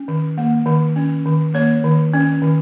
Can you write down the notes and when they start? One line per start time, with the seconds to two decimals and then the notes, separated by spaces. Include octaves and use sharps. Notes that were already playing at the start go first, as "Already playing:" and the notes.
Already playing: C#4
0.08 D#3
0.38 A#3
0.66 D#3
0.96 C#4
1.26 D#3
1.54 A#3 C#5
1.84 D#3
2.14 C#4
2.42 D#3